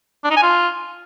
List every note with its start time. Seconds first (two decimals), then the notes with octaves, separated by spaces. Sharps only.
0.24 D4
0.31 D#4
0.37 G#5
0.43 F4